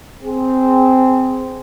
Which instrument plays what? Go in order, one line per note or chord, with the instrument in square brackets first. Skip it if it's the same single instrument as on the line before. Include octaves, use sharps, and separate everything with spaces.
[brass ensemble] C4 G#4